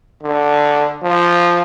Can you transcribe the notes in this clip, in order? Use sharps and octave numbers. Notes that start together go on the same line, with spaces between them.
D3
F3